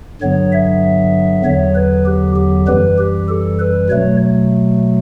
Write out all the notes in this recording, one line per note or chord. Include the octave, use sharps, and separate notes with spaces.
G2 D3 F#3 B3 C#5
E5
E2 D3 F#3 B3 C#5
B4
G4
G4
F#2 E3 G3 B4
G4
A4
B4
B2 F#3 A3 C#5